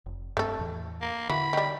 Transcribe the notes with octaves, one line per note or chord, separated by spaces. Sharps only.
F1
G2 A3 C4 A4
E2 A2 E3
A#3
D3 E3 F#4 B5
D#3 G3